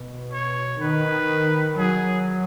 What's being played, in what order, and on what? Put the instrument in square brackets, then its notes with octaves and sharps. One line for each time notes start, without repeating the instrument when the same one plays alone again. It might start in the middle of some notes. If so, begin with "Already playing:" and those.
Already playing: [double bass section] B2
[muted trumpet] C#5
[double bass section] D#3 [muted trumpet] B4
[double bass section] F#3 [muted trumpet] G#4